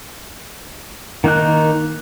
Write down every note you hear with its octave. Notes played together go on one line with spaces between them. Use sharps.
D#3 A#3 D#4 A#4 F#6